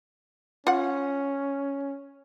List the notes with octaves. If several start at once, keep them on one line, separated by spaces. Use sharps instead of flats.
C#4 F4 F#5